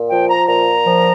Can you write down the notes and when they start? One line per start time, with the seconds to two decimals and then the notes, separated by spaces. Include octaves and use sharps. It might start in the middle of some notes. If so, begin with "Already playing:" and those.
Already playing: A#2
0.10 F3 G5
0.29 A#5
0.47 A#2 A#5
0.85 F3